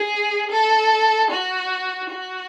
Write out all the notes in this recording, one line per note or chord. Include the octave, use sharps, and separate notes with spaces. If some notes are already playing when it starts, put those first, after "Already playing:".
Already playing: G#4
A4
F#4
F#4